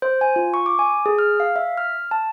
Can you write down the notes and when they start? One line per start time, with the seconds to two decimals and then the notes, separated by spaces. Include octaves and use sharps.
0.02 C5
0.21 G#5
0.36 F4
0.54 C#6
0.66 D6
0.79 G#5
1.06 G#4
1.18 F6
1.40 F5
1.56 E5
1.77 F6
2.11 A5